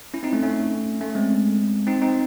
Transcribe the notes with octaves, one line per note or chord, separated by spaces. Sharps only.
C#4 E4
C4 D#4
A3 C#4
A3 C#4
A3 C#4
G#3 C4
C4 D#4
C4 D#4